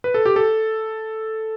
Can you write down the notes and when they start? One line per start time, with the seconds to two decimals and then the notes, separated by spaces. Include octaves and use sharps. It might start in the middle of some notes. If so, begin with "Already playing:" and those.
0.04 B4
0.14 A4
0.25 G4
0.36 A4